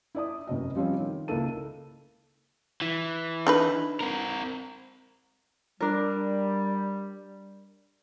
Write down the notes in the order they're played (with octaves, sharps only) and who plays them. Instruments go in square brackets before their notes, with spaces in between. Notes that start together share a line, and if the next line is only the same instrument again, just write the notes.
[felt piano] E4 D5 D#6
F1 F#2 D#5
F3 G3 C4 C#4
D#3
C#2 A#3 E4 A4 D#7
[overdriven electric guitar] E3
[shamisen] D4 D#4 B4
[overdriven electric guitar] C4 A#4
[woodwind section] G3 [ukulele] D4 A#4